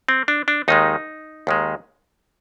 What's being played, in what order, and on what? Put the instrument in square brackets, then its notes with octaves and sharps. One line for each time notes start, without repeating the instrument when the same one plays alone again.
[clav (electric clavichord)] C4
D4
D4
D#2 D#3 G#3 D#4
D#2 D#3 G#3